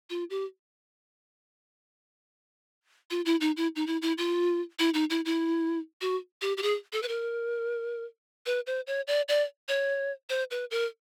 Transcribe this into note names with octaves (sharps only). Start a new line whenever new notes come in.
F4
G4
F4
E4
D#4
E4
D#4
E4
E4
F4
E4
D#4
E4
E4
F#4
G4
G4
G#4
A4
B4
A#4
B4
C5
C#5
D5
D5
C#5
C5
B4
A#4